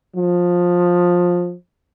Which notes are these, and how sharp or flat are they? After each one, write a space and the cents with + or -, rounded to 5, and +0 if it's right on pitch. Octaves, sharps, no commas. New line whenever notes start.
F3 +15